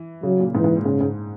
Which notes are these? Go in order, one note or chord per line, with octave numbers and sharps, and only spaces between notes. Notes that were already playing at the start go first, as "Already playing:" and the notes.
Already playing: E3
C#3 F#3
A#2
G#2 E3
G#2
A#2
G#2 C#3
G#2